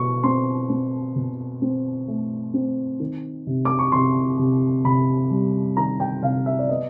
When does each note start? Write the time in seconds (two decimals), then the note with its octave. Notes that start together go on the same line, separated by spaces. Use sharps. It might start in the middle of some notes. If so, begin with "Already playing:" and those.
Already playing: B2 C#6
0.23 C4 C6
0.70 C4
1.16 B2
1.62 C4
2.08 A3
2.54 C4
3.00 D#3
3.47 C3
3.65 D6
3.79 C#6
3.92 C3 C6
4.39 C3
4.84 C3 B5
5.31 G3
5.77 D#3 A#5
6.00 G5
6.22 C3 F5
6.46 E5
6.59 D5
6.69 B3 D#5